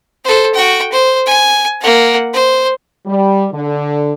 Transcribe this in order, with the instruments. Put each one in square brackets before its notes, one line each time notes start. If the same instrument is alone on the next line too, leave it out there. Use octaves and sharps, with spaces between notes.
[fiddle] A4 C5
F#4 G5
C5
G#5
A#3 F#5
C5
[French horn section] G3
D3